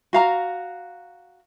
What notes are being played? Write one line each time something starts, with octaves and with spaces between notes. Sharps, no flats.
F#4 F5 A#5